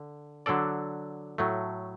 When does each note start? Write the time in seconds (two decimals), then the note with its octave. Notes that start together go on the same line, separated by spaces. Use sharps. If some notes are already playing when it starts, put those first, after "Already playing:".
Already playing: D3
0.46 D3 F#3 D4 A4 D5
1.38 A2 F#3 A3